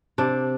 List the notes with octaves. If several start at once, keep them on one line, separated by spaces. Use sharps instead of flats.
C3 D4